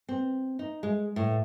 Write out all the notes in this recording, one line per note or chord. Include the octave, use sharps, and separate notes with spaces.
C4
D#4
G#3
A2